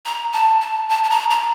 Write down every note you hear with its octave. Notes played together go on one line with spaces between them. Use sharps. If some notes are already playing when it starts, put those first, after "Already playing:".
A#5
A5
A5
A5
A5
A#5
A#5